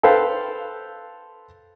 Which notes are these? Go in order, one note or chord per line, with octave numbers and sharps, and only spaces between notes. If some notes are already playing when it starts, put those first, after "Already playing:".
A4 B4 C5 F5 G5